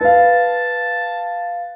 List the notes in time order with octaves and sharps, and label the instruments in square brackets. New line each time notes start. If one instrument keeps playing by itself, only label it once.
[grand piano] B4 F5 [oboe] A5